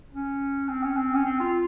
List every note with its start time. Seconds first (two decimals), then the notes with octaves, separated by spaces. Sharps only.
0.13 C#4
0.69 C4
0.83 C#4
0.97 C4
1.15 C#4
1.25 C4
1.40 F4